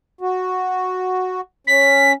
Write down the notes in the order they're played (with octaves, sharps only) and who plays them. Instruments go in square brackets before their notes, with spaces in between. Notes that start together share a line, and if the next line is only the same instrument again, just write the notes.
[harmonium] F#4
[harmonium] C#4 [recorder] B6